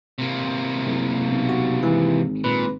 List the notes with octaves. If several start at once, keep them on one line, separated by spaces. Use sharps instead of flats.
C3 A#3
F#1
B1
F#4
G#1 E3
A#2 B4